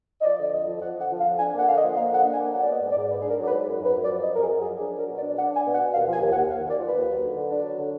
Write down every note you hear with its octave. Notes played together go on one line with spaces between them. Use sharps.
D#5
F3 D5
D3 D5
F2 D#5
F3
F3 F#5
D3 F#5
F3
F5
F2
D4 G#5
A#3
F#5
D3 F5
D#5
F3
A#3 F5
D3 F#5
D4
G#5
A#3
F#3 F#5
D5
B3
D#5
G#2
D5
G#2
G#2 B4
D4 G#4
A#4
F#3 D5
B4
G#2
F#2
F#2
B4
F#2
D5
F3
F#2 D#5
A#4
F#2 G#4
F#2
G#4
F3
D4 G#4
F#3 A#4
B2
D5
D4
D4 F#5
D4 G#5
B2
F#5
B2
D#2 F5
F3
G#5
D#2
F#5
D#2
D#2 F5
D#2
D5
F3
D#2 B4
F#3
D3
D3
D4
F#3
D3